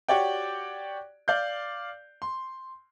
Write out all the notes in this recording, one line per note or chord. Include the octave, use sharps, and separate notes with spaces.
F#4 G4 C#5 D5 G5
D5 F5 G6
C6